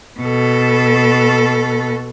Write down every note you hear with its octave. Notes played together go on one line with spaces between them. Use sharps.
B2 A4